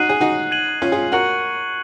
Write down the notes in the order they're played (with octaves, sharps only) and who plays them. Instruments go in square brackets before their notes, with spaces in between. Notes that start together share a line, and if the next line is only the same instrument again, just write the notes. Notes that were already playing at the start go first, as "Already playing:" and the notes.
Already playing: [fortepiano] D#4 F#4 [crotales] F#6 C7 D#7 F#7
[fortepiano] G#4
D#4 F#4
[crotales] G#6 D#7 F#7
[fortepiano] C#4 F4
F4 G#4
[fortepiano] F#4 A#4 [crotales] C#6 F#6 C#7 F#7